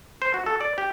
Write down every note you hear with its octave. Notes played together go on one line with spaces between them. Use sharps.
C5
F#4
A4
D5
G4